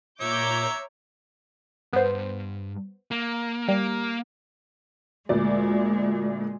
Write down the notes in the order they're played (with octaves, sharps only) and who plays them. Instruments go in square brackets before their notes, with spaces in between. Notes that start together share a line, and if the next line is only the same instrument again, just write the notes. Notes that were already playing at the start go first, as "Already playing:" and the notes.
[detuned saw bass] A#2 [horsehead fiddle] C#5 [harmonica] E5 [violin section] A#5 D6 G6
[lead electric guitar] G2 [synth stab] B3 C5
[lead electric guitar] A#3
[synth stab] G3 [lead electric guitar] A#3
[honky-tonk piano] D2 A#2 D5 [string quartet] G#3